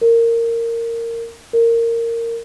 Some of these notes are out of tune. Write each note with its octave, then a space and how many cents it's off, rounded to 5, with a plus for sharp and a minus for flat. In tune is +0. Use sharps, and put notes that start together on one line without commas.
A#4 -15
A#4 -15